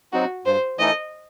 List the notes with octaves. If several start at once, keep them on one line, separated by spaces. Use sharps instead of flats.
F#3 C4 D#4 F#4
G2 C5
E3 A3 D#4 A4 D#5